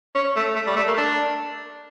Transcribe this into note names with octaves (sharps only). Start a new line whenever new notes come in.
C#4
A3
A3
G3
A3
A#3
D4